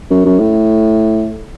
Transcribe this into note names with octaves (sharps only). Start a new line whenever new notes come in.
F#2
F#2
A2